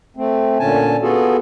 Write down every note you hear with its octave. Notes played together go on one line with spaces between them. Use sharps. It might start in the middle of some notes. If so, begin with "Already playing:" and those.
A3 C4
A#2 D3 C#4 G#5 A5
B3 F4 F#4 G#4 A4